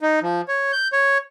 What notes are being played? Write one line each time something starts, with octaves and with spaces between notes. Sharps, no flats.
D#4
F3
C#5
G6
C#5